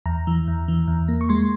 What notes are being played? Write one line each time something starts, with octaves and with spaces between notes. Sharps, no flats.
E2 A#5
E3
E2
E3
E2
A#3
C#6
G#3 C6